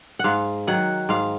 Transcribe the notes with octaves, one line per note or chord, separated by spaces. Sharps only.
G#2 F5 F#5
D#3 F#3 F#5
G#2 F5